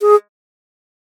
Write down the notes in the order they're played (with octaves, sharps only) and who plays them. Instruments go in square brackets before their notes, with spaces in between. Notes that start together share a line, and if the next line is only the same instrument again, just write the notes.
[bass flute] G#4